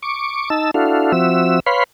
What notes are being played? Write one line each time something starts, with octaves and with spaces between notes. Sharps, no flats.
C#6 D6
D#4 A5 E6
D4 E4 F#4 A4 F5
F3 C4 F#4 E5 E6
B4 C#5 F5 B5 C6